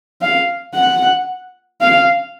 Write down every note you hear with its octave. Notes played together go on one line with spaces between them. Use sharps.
F5
F#5
F5